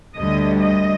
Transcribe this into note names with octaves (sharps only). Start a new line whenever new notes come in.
D2 D3 G3 D#5
D#5